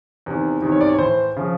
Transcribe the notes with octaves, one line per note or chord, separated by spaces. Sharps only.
E2 C3 D#3
E2 C3 D#3
C#5
D5
C#5
A2 E3 C5
C#3 F3